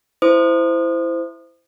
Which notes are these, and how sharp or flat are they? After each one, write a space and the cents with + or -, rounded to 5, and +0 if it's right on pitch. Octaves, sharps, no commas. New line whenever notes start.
E4 +10 C5 -20 D#6 -35